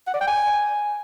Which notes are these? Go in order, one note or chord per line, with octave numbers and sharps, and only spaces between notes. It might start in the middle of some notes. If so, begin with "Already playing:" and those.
F#5
D5
G5
G#5